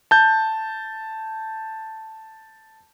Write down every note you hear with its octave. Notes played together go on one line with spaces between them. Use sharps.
A5 G6